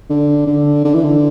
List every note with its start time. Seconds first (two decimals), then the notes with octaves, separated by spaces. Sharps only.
0.10 D3
0.46 D3
0.84 D3
0.94 E3
1.03 D3